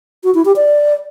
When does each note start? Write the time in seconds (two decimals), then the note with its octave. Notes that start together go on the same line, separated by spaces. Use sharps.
0.24 F#4
0.34 E4
0.45 G4
0.56 D5